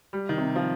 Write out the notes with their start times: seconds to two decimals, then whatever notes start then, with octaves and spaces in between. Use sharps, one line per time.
0.13 G3
0.29 D#3
0.38 C3
0.56 F3